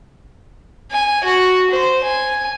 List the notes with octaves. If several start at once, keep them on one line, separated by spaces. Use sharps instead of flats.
G#5
F#4
C5
G#5